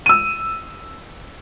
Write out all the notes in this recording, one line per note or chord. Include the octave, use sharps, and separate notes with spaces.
E6 D#7